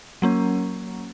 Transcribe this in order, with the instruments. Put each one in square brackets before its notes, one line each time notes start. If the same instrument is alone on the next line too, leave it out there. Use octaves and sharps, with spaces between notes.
[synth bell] F#3 A#3 C#4